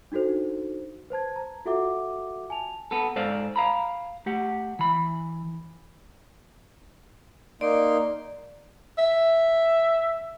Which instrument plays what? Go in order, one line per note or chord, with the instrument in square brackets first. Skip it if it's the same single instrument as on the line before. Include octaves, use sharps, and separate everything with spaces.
[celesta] D4 D#4 F#4 A4 C5
B4 C5 A5 G#6
A#5
F4 F#4 A4 E5 F#5 D6
G#5 A5 F7
[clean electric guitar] B3 A4
G#2 A4 C5 D5 F5
F5 A#5 B5
A3 G4 F#5
E3 B5
[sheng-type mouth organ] A#3 D#4 C6 [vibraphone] D5
[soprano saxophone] E5